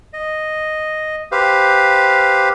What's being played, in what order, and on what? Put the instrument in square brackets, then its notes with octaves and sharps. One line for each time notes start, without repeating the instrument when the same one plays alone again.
[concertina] D#5
G4 B4 C5 F5